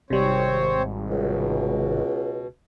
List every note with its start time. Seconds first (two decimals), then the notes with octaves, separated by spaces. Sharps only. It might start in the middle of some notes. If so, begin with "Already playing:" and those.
0.10 G#1 C3 G3 C4 C5 C#5
1.10 C#2 B2